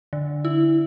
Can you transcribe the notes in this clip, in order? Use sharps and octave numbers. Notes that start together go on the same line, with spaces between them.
D3
E4